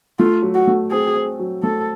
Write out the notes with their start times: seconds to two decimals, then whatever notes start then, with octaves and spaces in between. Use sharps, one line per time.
0.19 A3 F4
0.42 F#3
0.55 F#4
0.67 A3
0.91 C4 G#4
1.15 C4
1.39 F#3
1.63 A3 A4